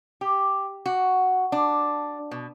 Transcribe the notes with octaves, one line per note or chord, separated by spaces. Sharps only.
G4
F#4
D4
B2